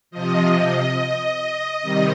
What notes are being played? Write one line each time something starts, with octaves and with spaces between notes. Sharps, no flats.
C3 F3 D#5
C3 D#3 G3